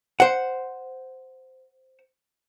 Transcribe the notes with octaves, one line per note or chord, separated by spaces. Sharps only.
C5 F#5